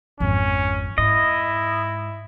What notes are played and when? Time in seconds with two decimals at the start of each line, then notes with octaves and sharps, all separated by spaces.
0.20 G#1 F2 C#4
0.98 G#2 E4 D#5